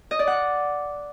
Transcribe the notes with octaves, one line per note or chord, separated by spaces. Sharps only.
D#5
D5
F#5